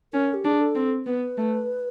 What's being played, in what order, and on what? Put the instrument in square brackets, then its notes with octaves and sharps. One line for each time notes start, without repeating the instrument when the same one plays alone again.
[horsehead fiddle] C#4 [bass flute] A#4
[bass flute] G4
[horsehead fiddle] D4 [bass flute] G#4
[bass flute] A4
[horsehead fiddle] C4
[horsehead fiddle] B3 [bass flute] B4
[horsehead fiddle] A3